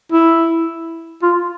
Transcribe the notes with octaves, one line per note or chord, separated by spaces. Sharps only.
E4
F4